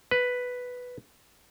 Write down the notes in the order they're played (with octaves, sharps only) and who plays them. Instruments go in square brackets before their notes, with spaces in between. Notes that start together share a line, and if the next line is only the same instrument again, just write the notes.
[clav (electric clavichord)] B4